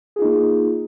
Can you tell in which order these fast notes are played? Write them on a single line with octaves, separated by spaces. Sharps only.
G#4 F4 D#4 A#3